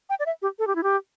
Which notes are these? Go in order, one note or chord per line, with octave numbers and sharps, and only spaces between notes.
G5
D5
E5
G4
A4
G4
E4
G4